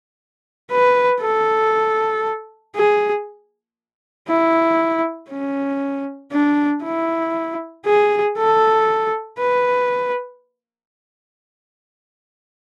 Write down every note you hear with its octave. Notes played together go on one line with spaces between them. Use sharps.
B4
A4
G#4
E4
C#4
D4
E4
G#4
A4
B4